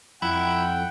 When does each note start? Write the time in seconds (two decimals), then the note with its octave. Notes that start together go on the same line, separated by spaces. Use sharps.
0.22 F2 E4 F#5 G5